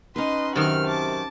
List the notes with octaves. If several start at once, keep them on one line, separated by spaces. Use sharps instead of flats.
C#4 D#4 B4 D#5 C6
F#2 C3 D#3 F#4 F6
A5 D6